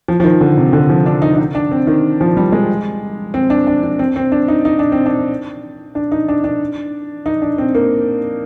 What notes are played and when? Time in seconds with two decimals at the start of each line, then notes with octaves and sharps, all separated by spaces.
0.08 F3
0.20 F3
0.24 D#3
0.41 D3
0.57 C3
0.73 D3
0.90 F3
1.06 D4
1.22 D#4
1.34 D4
1.38 D#4
1.55 D4
1.71 C4
1.87 D#3
2.21 F3
2.37 G3
2.52 G#3
3.34 C4
3.50 D4
3.67 D4
3.83 D4
3.99 C4
4.16 C4
4.32 D4
4.48 D#4
4.65 D#4
4.79 D4
4.92 C4
5.06 D4
5.95 D4
6.12 D#4
6.28 D4
6.44 D4
7.26 D#4
7.42 D4
7.58 C4
7.75 A#3